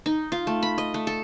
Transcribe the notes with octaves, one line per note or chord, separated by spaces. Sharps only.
D#4
F4
A3
B5
D#5
A3
A4